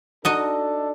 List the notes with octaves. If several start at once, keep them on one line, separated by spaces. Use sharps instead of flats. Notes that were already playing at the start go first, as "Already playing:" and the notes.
D4 D#4 F#4 A4 D#5